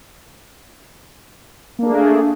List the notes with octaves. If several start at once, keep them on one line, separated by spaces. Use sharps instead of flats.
A3 A#3 D4 G#4